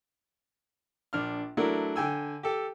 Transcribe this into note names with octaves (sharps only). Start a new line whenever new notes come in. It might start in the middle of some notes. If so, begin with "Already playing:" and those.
A#1 D4 F6
F#3 A3 D4 E4 A#4
D3 G5 G#5 E6
G4 A4